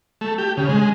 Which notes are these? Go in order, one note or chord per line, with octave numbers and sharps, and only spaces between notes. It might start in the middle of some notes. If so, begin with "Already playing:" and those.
A3
G4
C#3
G#3